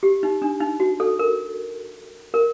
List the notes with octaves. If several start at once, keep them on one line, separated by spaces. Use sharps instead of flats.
G4
D#4
D4
D#4
F#4
A4
A#4
A#4